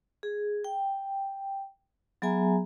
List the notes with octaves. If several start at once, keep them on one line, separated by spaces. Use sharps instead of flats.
G#4
G5
F#3 B3 G#4 E5 G#5 A#5